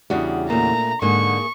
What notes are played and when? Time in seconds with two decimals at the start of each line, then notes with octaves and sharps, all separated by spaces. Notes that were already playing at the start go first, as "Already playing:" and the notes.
0.10 E2 C#3 G3 D4 F#4
0.50 A#2 A3 A#5
1.02 G#2 D3 A#3 G#4 C#6